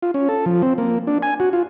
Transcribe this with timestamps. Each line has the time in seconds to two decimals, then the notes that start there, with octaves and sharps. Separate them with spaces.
0.02 F4
0.14 C#4
0.29 A4
0.46 F3
0.62 C4
0.78 A#3
1.07 D4
1.22 G#5
1.40 F#4
1.53 F4